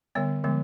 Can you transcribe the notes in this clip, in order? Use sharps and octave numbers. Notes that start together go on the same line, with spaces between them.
D3 G3 B3 C#5
D3 F3 G#3 B3